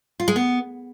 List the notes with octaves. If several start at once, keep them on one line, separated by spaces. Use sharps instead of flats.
F4
G#3
B3